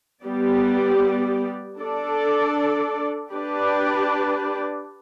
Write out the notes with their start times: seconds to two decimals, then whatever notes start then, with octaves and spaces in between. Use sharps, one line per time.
0.24 G3 B3 G4 D5
1.79 D4 A4 D5
3.34 D4 G4 B4 D5